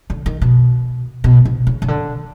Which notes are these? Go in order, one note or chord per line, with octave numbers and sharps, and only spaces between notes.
D3
D#3
B2
B2
C3
C#3
C#3
D3